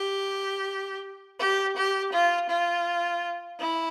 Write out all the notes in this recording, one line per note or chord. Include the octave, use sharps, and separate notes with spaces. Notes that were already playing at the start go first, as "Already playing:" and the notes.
Already playing: G4
G4
G4
F4
F4
E4